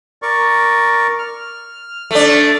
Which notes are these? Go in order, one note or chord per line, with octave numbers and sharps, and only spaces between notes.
A#4 D5 C#6
F6
A3 D4